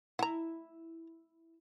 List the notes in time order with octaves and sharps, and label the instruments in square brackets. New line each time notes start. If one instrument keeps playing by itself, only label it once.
[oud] E4 [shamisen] F#5 A#5